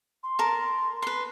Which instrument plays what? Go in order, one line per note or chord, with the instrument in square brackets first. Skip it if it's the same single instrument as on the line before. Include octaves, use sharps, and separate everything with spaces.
[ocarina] C6
[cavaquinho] A#4 A5
B4 C6